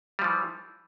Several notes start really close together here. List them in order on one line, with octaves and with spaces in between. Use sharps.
G3 F3 E3